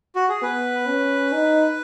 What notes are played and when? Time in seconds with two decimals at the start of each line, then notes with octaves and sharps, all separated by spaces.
0.16 F#4
0.29 G#4
0.42 B3 B4
0.88 C#4
1.34 D#4